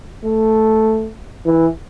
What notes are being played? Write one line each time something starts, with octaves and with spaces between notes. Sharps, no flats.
A3
E3